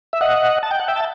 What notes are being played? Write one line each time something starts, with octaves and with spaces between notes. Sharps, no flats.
E5
D#5 F#5
A5
G5
F#5
E5 G5
A5